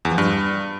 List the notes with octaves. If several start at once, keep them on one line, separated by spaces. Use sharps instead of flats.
E2
F3
G2